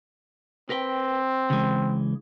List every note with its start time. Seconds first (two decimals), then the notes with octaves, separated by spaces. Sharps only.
0.70 C4 A#4 B4 G5
1.50 C#3 E3 G#3